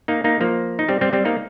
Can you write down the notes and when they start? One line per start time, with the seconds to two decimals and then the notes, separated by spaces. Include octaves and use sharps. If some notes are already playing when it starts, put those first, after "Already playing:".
0.08 A#3 D#4
0.24 A#3 D#4
0.41 F3 A#3
0.79 D#4
0.89 G3 C4
1.01 G3 C4
1.13 G3 C4
1.25 A#3 D#4